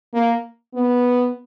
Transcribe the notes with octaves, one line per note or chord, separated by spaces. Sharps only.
A#3
B3